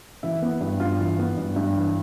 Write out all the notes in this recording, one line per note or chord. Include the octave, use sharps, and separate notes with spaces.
E3 E4
B3
G2
G2 F4
E3
B3
G2
G2
E3